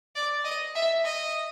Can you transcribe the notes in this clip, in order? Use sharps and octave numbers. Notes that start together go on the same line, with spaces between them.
D5
D#5
E5
D#5